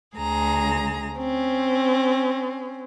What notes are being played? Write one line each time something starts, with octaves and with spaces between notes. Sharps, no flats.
D2 G#4 A#5
C4 C#4